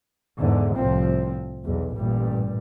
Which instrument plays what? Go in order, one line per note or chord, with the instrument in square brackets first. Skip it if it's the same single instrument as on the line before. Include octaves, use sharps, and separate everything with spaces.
[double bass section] E2 G#2 D3
C2 A2 F3 C4
B1 E2
A1 G2 A#2 G3